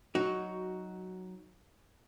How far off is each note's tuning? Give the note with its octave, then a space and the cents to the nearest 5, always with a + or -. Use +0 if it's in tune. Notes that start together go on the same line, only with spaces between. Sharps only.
F#3 +0 D#4 +0 F#4 +10